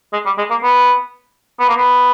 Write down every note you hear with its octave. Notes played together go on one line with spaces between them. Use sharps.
G#3
G3
G#3
A#3
B3
B3
A#3
B3